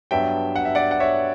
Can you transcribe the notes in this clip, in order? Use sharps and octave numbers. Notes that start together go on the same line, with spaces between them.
G2 F#3 B3 D4 E5 G5
F#5
E5
D5 F#5
F#5
C#5 E5